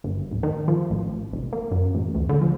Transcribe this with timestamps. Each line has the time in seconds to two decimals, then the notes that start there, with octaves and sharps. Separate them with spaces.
0.04 G1
0.31 D1
0.43 D#3
0.68 F3
0.90 A1
1.33 F1
1.53 A#3
1.71 F#2
1.95 A1
2.14 D2
2.29 D3
2.41 F3